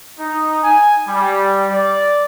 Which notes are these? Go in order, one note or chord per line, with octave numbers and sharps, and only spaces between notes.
D#4
G#5
G3
D5